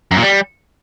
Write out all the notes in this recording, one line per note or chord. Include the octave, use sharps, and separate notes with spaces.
F#2
A#2
G3